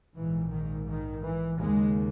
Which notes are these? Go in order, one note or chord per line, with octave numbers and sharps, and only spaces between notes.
A#1 G#2 E3
D#3
D#3
E3
D#2 C#3 G#3